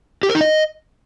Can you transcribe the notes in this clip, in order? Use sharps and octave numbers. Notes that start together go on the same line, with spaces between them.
G4
A#4
D#4
D#5